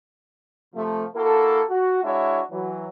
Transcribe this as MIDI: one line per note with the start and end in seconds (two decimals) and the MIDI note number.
0.75 1.05 48
0.75 1.05 53
0.75 1.05 57
1.15 1.62 58
1.15 1.62 64
1.15 1.62 66
1.15 1.62 69
1.69 2.01 66
2.04 2.41 56
2.04 2.41 62
2.04 2.41 64
2.04 2.41 66
2.04 2.41 73
2.04 2.41 76
2.51 2.88 52
2.51 2.88 54